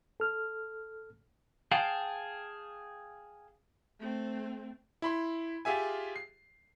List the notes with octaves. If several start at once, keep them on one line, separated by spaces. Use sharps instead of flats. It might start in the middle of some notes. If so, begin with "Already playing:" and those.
A4 F6
G#4 F5 G5 A5
A3 C4
E4 B5 C6
F4 G4 G#4 E5 G#5
C7